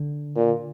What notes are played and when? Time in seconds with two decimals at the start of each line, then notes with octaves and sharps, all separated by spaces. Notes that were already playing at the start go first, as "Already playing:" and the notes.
Already playing: D3
0.36 A#2